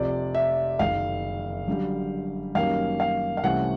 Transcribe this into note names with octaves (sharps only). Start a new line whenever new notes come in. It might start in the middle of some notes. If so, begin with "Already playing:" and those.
Already playing: F1 F2 C3 F3 D5
E5
F#1 F#2 D#3 F5
F#2 D3 G3
F#2 D#3 G3 A#3 C#4 F5
F5
F5
C2 C3 E3 A3 C#4 F#5